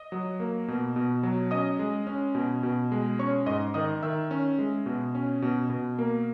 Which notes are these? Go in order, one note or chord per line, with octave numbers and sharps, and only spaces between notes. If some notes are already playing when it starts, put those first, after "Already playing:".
Already playing: D#5 D#6
F#3
A#3
B2
B2
F#3
C#4 D#5 D#6
G#3
C#4
B2
B2
G#3
C#4 C#5 C#6
G#2 D#5 D#6
D#3 D#5 D#6
D#3 E5 E6
C#4
G#3
B2
C#4
B2
B2
A#3